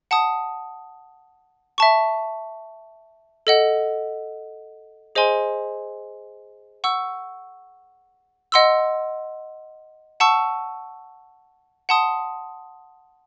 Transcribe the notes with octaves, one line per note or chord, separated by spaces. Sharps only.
F#5 A5 D#6
E5 A5 C#6
A4 D#5 F#5
G#4 C5 D#5 G#5 C6
F#5 C#6 E6
D#5 F#5 C6 E6
F#5 A5 C#6 E6
F#5 A5 C6 D#6